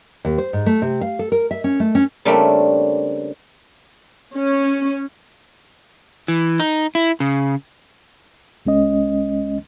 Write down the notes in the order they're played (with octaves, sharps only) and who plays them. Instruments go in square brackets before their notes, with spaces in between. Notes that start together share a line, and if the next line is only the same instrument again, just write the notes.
[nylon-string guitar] D#2
C5
G#2
A3
C3
F5
A4
A#4
E5
C#4
A3
C#4
[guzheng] C#3 G3 A3 A#3 C4 D4
[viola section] C#4
[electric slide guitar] E3
D#4
E4
C#3
[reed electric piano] C2 G#3 C#4 D#5